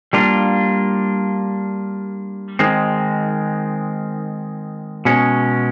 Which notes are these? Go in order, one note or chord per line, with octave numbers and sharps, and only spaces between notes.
G3 A#3 D4 F4
D#3 G#3 C4
B2 G#3 C#4